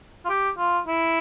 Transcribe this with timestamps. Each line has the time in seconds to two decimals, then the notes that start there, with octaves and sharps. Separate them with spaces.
0.25 F4
0.29 G4
0.58 F4
0.88 E4